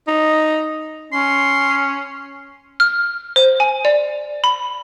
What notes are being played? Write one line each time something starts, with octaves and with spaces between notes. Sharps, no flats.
D#4
C#4 C6
F6
C5
G#5
D5
B5